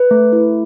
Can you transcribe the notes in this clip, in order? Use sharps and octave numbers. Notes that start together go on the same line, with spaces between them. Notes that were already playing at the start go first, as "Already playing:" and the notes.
Already playing: B4
A3
E4